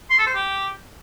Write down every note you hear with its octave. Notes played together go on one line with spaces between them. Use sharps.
C6
A4
C5
G4